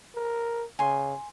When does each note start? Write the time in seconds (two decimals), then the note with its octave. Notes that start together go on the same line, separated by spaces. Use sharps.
0.15 A#4
0.79 C#3 G#5 C6